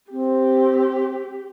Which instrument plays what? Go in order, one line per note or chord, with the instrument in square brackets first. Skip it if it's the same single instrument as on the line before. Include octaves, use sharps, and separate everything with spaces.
[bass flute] C4 [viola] G4